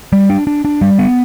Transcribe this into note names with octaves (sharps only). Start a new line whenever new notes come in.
G3
D4
D4
D4
G3
B3